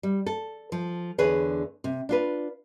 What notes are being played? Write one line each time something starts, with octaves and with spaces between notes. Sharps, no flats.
G3
A4
F3
E2 D3 D4 G#4 B4 C#5
C3
D4 F4 B4